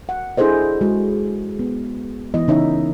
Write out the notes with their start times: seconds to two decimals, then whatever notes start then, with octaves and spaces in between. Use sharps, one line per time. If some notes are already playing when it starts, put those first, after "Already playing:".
0.09 F#5
0.37 D4 E4 G#4 A4 C5 D#5
0.81 G#3 F#4
1.59 B3
2.34 E3 B3 E4 D#5
2.48 C#3 E3 D#4 C#5 E5